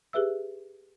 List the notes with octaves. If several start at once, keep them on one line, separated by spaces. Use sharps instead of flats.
G4 G#4 B4 E5 E6